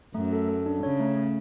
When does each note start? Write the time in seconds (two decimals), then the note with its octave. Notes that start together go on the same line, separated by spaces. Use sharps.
0.15 F#2 A3
0.33 A4
0.49 A4
0.66 D4
0.83 C#3 C#5
1.00 A3
1.17 A3